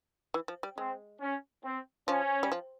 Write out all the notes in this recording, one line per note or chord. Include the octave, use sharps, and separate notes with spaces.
E3
F3
G3
G#3 C4
C#4
C4
F3 C#4
G3
F3